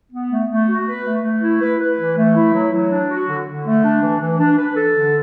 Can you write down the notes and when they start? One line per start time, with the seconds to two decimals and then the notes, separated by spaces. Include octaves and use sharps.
0.12 B3
0.31 A3
0.50 A3
0.68 F#4
0.87 B4
1.05 A3
1.24 A3
1.42 E4
1.61 B4
1.79 B4
1.98 E3
2.17 A3
2.35 E4
2.53 F#3
2.72 F#3
2.90 D4
3.09 F#4
3.28 D3
3.46 D3
3.65 A3
3.83 D4
4.02 E3
4.21 E3
4.39 D4
4.58 B4
4.76 A4
4.95 D3